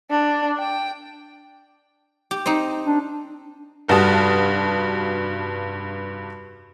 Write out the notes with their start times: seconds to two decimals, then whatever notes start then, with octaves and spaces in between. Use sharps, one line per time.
0.10 D4
0.59 G5
2.31 G4
2.46 C4 D#4
2.86 D4
3.88 F1 G2 F#4 A5 D#6